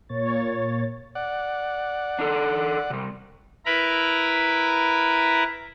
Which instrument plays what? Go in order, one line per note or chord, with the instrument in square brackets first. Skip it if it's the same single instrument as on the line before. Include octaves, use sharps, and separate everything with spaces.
[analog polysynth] A#2 A#3 C#5 A6
[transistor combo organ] D5 F#5
[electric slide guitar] D4 D#4 A4
C3 G3
[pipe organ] E4 A#4 B4 A#5 B5